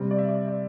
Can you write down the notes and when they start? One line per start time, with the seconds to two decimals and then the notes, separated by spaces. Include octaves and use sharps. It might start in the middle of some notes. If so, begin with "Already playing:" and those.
Already playing: C3 G3 C4
0.11 D5
0.18 E5
0.29 D5
0.48 D5